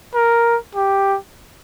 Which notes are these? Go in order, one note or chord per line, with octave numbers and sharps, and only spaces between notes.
A#4
G4